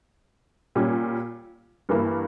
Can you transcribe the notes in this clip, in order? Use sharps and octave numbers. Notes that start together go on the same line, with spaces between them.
A#2 G3 C#4
G2 E3 A#3 E4